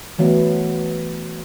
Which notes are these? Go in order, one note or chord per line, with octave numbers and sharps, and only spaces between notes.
E3 F#3 A3 B3